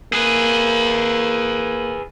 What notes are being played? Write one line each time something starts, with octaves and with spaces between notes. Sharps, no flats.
A#3 G#4 B4